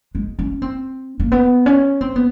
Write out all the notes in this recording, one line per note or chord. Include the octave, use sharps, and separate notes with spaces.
G#3
C#4
C4
A#3
B3
C#4
C4
B3